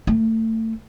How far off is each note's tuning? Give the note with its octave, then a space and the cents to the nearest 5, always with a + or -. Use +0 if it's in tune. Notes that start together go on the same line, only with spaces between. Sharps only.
A3 +25